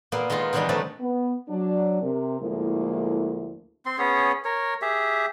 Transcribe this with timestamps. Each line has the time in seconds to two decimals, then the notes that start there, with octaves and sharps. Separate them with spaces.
0.12 A#2 A#3 B3
0.30 D#3 G#3 D#4 F4
0.53 B2 D#3 E3 G3 D4 D#4
0.69 C3 F#3 G3 A3 B3 A4
1.00 B3
1.49 F#3 D4
2.02 C3 A#4
2.40 D2 A2 F3 G#3 A#3 E4
3.86 C4 C6
3.98 B3 C#4 G#4 C#5
4.45 A#4 C#5
4.82 G4 G#4 E5